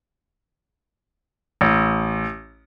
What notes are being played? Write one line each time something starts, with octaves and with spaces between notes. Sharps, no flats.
A1